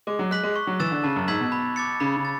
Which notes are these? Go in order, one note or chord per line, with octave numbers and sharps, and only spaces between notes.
G#3 D6
F#3
G#3 F#6 B6 F#7
G#3
C#6
F#3
E3 E6 A6 E7
D3
C#3 A5
F#2
G#2 E6 G#6 B6 F#7
B2
B5
D6 A6 C#7
C#3 B5
C#3
A6